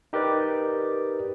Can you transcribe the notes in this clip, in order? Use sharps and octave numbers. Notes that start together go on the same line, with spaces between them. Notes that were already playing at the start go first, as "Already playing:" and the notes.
D#4 G4 A#4 B4 D5